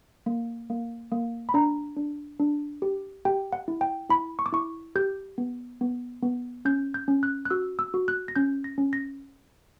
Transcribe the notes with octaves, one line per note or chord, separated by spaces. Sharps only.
A#3
A#3
A#3
B5
D4 A#5
D4
D4
G4
G4 G5
F#5
E4
G5
E4 B5
C#6
D6
E4 C#6
G4 G6
B3
B3
B3
C#4 G6
G6
C#4
F#6
F#6
F#4 E6
E6
F#4
F#6
A#6
C#4 G6
A#6
C#4
A#6